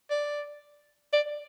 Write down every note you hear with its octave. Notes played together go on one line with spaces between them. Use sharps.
D5
D5